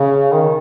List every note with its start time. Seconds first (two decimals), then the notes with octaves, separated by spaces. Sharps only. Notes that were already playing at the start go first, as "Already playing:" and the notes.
Already playing: C#3
0.32 D#3